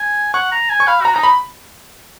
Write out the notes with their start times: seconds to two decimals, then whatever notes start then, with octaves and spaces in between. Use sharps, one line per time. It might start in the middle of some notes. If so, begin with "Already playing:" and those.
Already playing: G#5
0.34 F#5 C#6
0.52 A#5
0.69 G#5
0.80 C#6
0.87 F5 B5
1.01 F#4 A#5
1.15 D#4 A#5
1.23 B5